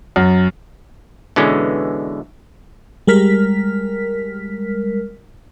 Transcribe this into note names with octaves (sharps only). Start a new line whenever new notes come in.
F#2
B2 D3 E3 G#3 C#4
G3 G#3 A#4 F6 B6